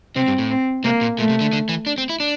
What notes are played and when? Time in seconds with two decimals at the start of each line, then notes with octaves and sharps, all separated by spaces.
0.16 C3 C4
0.28 G2
0.38 A2
0.50 C4
0.84 C3 A#3
1.01 A#2
1.18 A#2 A3
1.30 C3
1.41 D3
1.53 D3
1.69 E3
1.86 D4
1.98 C4
2.09 E4
2.20 D4